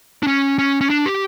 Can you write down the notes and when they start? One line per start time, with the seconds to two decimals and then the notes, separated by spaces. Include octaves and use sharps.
0.23 D4
0.27 C#4
0.59 C#4
0.81 C#4
0.90 D4
1.06 G4